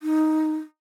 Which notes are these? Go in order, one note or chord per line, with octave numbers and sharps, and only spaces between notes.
D#4